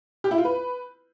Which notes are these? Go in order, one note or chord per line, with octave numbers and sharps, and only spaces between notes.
G4
E4
F4
B4